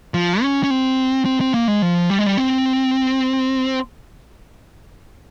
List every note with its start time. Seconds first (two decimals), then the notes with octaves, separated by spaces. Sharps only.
0.14 F3
0.42 C#4
0.63 C#4
0.70 C4
1.26 C4
1.40 C4
1.54 A#3
1.68 G#3
1.82 F3
2.10 G3
2.19 G#3
2.26 G3
2.37 C4